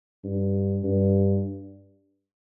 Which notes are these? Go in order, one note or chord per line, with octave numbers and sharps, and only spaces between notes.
G2
G2